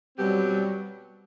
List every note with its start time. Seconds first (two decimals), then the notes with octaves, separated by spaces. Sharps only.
0.18 B2 F#3 G3 C4 G4
0.49 G3